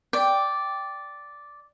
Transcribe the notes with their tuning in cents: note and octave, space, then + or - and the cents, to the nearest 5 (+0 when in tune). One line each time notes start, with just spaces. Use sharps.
D5 -5 G5 +0